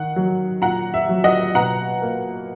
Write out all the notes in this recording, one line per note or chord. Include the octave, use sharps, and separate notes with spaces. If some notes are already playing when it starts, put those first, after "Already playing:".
Already playing: D#3 F#5
F#3
A#2 F#5 A#5
E5
F#3
D#5 F#5
B2 F#5 A#5
A#3